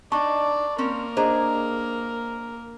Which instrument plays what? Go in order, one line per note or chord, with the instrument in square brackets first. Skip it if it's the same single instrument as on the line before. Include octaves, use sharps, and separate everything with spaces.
[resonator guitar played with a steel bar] D4 D#4 [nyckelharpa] D5 [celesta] A5 C#6
[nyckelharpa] A#3 A#4 [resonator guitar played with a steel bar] C4 C#4
[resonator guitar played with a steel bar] D4 G#4 [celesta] C5 D#5 A#5